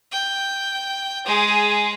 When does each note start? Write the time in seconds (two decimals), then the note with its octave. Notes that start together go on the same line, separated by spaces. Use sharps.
0.11 G5
1.26 G#3 G#4